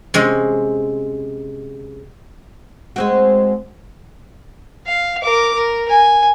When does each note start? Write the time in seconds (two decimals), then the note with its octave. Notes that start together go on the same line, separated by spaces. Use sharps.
0.14 C3 G#3 C#4
2.96 G#3 C4 F#4
4.87 F5
5.23 A#4 D6
5.54 A#4
5.90 G#5